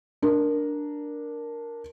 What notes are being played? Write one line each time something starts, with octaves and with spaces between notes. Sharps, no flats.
D4 A#4